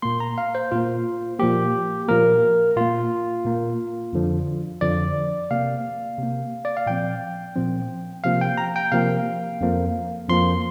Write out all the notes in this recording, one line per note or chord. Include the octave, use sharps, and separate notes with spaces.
A#2 A#3 C6
A#5
F5
C5
A#2 A#3 F4
A#2 F3 A#3 G4
A#2 F3 A#3 A#4
A#2 A#3 F4
A#2 A#3
F2 D3 F3
F2 D3 F3 D5
C3 A#3 F5
C3
A#3
D5
F5
A#2 F3 C4 G5
A#2 F3 C4
C3 F3 A#3 F5
G5
A#5
G5
C3 F3 A#3 F5
F2 F3 A#3
F2 F3 A#3 C6